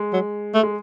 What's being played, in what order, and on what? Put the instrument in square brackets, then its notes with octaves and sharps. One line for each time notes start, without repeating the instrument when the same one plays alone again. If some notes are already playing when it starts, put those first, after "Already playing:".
Already playing: [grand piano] G#3
[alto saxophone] F#3
A3
[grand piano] G#3